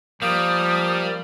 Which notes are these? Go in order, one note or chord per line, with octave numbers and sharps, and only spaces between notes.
F3 G3 A#3 D#6